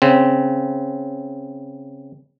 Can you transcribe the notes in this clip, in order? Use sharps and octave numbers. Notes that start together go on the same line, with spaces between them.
C#3 C4